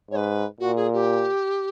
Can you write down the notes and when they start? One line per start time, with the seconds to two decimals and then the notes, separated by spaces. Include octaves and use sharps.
0.11 G#2 C#5
0.16 B4
0.60 A#2 F#4
0.76 G#4
0.93 G4